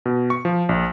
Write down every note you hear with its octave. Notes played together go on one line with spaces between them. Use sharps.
B2
C#6
F3
A#1